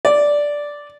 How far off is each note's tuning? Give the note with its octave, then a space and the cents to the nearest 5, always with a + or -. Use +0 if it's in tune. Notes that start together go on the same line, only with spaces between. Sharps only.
D5 -5